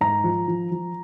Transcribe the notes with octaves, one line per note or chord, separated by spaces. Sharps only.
G#2 A#5
F3
F3
F3